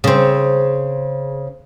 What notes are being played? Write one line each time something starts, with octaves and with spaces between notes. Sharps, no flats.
C#3 C4